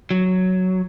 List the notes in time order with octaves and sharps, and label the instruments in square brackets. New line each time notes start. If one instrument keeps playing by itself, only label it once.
[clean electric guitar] F#3